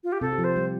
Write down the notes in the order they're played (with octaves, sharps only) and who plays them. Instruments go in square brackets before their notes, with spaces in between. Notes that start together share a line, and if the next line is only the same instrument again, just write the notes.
[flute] F4
G4
[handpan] C3 C4 [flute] A4
[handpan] G4
F3 F4
[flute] C5
[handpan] G3 G4